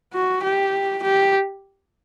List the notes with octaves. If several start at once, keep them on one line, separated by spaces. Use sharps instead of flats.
F#4
G4
G4